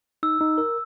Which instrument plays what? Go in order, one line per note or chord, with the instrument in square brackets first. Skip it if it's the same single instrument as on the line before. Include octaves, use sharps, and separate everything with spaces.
[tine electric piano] D#4 [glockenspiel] E6
[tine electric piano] D#4
[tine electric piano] A#4 [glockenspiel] E6